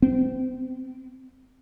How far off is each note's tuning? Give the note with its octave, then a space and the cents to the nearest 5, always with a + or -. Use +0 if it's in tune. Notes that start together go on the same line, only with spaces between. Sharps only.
C4 -30